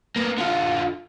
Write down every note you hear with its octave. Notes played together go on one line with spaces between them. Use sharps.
A#3 B3
D3 F4